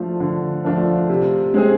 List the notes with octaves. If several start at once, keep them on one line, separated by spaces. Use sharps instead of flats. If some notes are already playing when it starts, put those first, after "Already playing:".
Already playing: F3 A3 D4 F4
D3
F3 A3 D4 F4
C3
G#3 C4 G#4